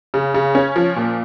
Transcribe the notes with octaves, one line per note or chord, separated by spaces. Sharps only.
C#3
C#3
C#4
F3
A#2